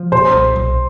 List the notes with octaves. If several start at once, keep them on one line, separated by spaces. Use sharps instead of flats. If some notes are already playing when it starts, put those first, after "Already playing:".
Already playing: F3
A#2 C5
B1
B1